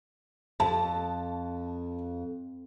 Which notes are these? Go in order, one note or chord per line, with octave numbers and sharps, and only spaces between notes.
F2 A5